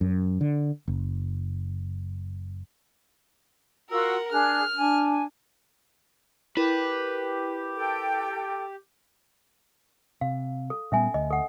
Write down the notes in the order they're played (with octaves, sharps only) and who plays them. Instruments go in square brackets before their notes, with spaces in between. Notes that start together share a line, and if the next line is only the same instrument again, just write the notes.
[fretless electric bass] F#2
D3
F#1
[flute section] F4 F#4 E6 [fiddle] A#4 F#5
[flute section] D4 G#4 F#6 [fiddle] F6
[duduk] D4 [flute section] G#5
[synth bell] E4 A#4 [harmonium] G4 [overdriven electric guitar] B4
[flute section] A4 G5
[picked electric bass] C3 [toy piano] F5
[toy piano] A4
[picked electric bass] A#2 G3 B3 [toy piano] C#4 E5 G#5
[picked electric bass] D2 [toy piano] D#5
[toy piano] A4 F#5